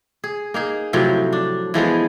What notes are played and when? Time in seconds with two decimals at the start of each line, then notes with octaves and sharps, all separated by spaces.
0.24 G#4
0.54 A#3 D#4 G#4
0.93 A2 C3 F3 F#3
1.33 D4
1.74 E3 F3 G#3 B3